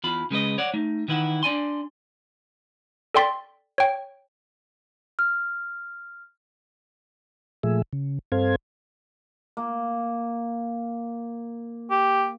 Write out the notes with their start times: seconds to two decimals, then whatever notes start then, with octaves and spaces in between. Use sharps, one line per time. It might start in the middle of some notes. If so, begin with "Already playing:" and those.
0.04 E2 F4 B5
0.31 C#3 G#3 B4 D#5
0.58 C#5 D5 F#5
0.74 A3 D#4
1.08 D#3 E3 E4 F#5
1.43 D4 D5 G#5 C6
3.14 A4 D5 G5 C6 A6 B6
3.78 C#5 G5
5.19 F6
7.63 A#2 F3 A3 G#4 E5
7.93 C#3
8.32 G2 C4 A4 C5 F5 G#6
9.57 A#3
11.90 G4